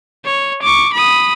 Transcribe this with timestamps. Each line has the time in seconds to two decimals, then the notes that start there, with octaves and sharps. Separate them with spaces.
0.25 C#5
0.62 C#6 D6
0.93 B5 D#6